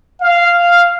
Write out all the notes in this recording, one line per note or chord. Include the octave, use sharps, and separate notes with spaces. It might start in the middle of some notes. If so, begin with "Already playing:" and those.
F5